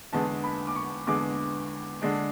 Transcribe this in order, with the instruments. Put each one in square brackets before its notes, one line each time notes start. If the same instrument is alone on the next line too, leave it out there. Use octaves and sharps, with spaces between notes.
[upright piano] E2 D3 G#3 B3 A5
B5
D6
C#6
E2 D3 G#3 B3 D6
D3 G#3 D4